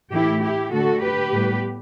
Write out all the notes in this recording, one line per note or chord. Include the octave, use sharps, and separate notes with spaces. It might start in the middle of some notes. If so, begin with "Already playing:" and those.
A2 E3 A3 E4 G4
E4 G4
D3 A3 F#4 A4
G4 B4
A2 G3 B3